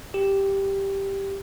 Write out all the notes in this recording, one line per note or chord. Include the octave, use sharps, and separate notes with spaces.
G4